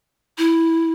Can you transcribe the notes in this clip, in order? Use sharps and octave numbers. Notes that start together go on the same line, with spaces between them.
E4